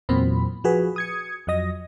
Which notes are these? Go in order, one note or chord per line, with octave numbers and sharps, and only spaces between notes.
E2 A#2 F#3 C4 B5
F3 F#4 G#4 B4
D#6 G#6 C#7
F2 F#3 D#5 A#6